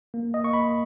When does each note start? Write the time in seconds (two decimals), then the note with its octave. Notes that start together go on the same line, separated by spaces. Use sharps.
0.14 A#3
0.34 D#5
0.44 A#3 C#6
0.53 B5